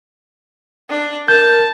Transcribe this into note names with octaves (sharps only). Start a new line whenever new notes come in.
D4
A#4 A5 G6